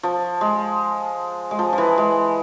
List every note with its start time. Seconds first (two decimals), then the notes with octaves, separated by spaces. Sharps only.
0.03 F3
0.41 G#3
1.51 G#3
1.59 F3
1.73 F3
1.78 E3
1.98 G#3